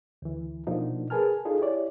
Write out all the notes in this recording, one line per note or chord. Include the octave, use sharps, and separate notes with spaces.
D2 E3
B2 F3 A#3 D4 D#4 F#4
G#4 A#4 B4 G#5 A5 F6
D#4 F4 G#4 A4
E4 G4 C#5 D5